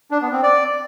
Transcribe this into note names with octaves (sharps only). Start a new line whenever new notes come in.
D4
B3
C4
D5